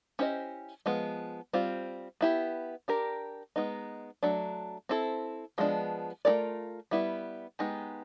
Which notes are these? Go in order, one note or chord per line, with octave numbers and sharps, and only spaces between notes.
C#4 E4 G4 C5 D#5
F3 G#3 B3
G3 C4 F4
B3 E4 G4
D4 G4 A#4
G#3 B3 D#4
F#3 A3 D4
C4 E4 A4
F3 G#3 B3 D4
A3 C#4 F4 A#4 D5
G3 B3 E4
G#3 B3 D#4 G4